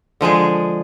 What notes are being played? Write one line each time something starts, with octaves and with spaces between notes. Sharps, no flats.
D3 F3 G#3 G#4